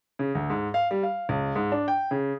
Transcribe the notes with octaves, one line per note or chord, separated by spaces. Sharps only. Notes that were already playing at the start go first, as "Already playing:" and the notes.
C#3
D2
G#2
F5
G3
F5
C#2
G#2
D4
G5
C#3